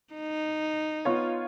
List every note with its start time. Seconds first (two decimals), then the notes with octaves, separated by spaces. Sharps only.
0.14 D#4
1.05 B3 F4 C#5